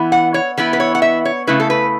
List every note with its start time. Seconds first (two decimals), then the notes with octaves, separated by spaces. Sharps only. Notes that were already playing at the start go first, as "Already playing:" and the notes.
Already playing: E3 B3 E4
0.12 F#5
0.34 C#5
0.57 E3 B3 E4 B4
0.73 B4
0.80 C#5
0.95 F#5
1.02 E5
1.25 C#5
1.47 C#3 A3 E4 B4
1.60 A4
1.70 B4